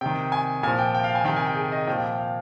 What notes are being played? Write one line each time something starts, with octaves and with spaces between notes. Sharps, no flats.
C3 D#3 G5
G#5
A#2 F3 G#5
G5
G5
F5
G#5
C3 D#3 G5
G#5
G5
G#4
D#5
A#2 F3 G5
G5
G5
F5